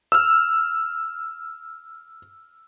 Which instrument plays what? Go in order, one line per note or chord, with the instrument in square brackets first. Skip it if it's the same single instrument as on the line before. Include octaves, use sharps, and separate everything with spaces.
[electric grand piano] E6 F6